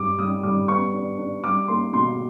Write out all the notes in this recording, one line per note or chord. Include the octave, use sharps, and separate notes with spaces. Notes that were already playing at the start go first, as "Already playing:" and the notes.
Already playing: G2 G3 D6
G3 D#6
G3 D6
B3 C#6
D4
D4
G3 D6
A#3 C6
B2 C6